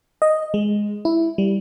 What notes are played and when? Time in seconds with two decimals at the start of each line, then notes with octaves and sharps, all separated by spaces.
0.22 D#5
0.54 G#3
1.05 E4
1.38 G3